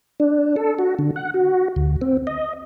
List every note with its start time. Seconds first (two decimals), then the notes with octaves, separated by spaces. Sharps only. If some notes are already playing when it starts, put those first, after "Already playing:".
0.20 D4
0.56 A4
0.79 F#4
0.99 D3
1.16 F#5
1.34 F#4
1.76 D2
2.01 C4
2.27 D#5